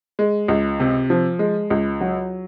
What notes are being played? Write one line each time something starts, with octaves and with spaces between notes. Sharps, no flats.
G#3
C#2
C3
F3
G#3
C#2
F#3